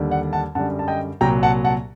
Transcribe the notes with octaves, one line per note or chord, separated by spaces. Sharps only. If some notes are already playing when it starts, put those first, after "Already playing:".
Already playing: D#2 D3 G3
D5 F#5
F#5 A5
F#2 D3 G3 F#5 A5
A5
D#5 G5
C2 A#2 F#3 G5 A#5
F#5 A5
F#5 A5